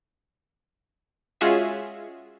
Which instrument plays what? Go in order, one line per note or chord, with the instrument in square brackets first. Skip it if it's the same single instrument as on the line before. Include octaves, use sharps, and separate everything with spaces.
[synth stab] G#3 C#4 F4 F#4 G#4 E5